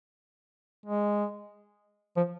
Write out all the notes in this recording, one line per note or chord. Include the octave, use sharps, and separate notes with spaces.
G#3
F3